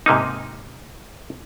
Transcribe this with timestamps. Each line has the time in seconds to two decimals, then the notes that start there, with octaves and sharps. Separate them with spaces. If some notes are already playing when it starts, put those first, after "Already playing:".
0.06 G#2 C3 A#3 D#4